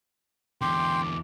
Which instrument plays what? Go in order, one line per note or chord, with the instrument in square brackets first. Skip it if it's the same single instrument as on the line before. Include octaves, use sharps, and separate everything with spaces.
[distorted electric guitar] E2 D3 [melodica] G5 C6 [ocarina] D6